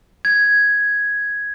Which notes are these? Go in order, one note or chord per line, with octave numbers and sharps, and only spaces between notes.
G#6